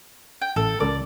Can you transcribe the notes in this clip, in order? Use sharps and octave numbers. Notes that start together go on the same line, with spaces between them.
G5
A1 A4
C#2 A4 A#4 D5